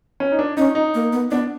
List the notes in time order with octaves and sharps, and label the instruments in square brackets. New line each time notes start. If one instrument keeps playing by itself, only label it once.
[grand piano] C#4
D#4
D4
[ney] C#4 [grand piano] D#4
[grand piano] D#4
[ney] A#3
B3
[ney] B3 [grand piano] D4